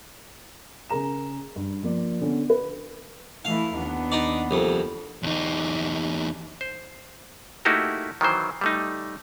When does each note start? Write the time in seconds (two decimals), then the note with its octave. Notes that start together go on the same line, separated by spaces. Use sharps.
0.90 C#3 G#4 A#4 A#5 E7
1.56 G2
1.83 F3 A#3 D5
2.21 D3 B3 C#4
2.50 B4
3.45 E3 A3 E4 F5
3.76 D#2 B3 D4
4.12 D#4 D5
4.51 C2 F2
5.23 E2 D#4
6.61 C5
7.65 A3 A#3 D#4 E4 F#4 G4
8.21 D#3 E3 F#3 C5
8.61 G3 A3 D#4